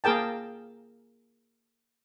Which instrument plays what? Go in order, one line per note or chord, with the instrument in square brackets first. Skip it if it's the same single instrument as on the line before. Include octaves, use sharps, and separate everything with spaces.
[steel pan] A#3 G#4 A#4 G5 A5